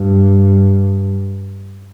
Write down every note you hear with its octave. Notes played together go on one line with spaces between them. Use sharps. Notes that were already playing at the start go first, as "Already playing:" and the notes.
Already playing: G2